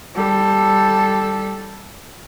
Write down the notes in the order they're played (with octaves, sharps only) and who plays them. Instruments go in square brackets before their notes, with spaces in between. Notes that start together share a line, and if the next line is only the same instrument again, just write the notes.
[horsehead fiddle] G3 A4